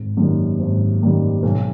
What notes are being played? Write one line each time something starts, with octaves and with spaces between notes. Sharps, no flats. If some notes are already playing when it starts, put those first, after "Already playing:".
Already playing: G#1
F#2 D#3 G3 A#3
G#1
F#2 D#3 G3 A#3
B1